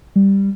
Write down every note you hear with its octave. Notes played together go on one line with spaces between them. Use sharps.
G3